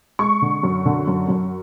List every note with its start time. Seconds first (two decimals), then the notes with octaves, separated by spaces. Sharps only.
0.19 G#3 C#6
0.42 D3
0.63 F#2
0.85 D3
1.08 F#2
1.29 F#2